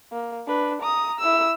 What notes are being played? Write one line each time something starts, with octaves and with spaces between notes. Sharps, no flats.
A#3
D4 B4
A#5 D#6
E4 E6